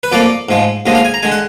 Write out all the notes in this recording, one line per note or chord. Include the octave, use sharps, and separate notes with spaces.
B4
F2 F3 A#3 D5
G#2 F3 G#3
D#2 D3 F3 G#3 D#5
F5
G#5
A#5
D3 G#3 G#5
F#5